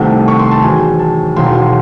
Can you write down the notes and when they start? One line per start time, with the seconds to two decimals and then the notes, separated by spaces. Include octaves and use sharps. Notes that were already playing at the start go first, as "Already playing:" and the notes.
Already playing: C2 C3 D#3 A3 F#5
0.28 C#6
0.39 C6
0.51 A5
0.63 E2 D#3 F#3 G#5
0.99 A5
1.36 E1 D#2 D#3 F#3 C6
1.55 C6